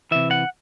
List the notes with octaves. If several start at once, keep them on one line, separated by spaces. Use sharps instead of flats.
C3 E3 E5
F#5